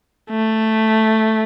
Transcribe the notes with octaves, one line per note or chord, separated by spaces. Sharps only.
A3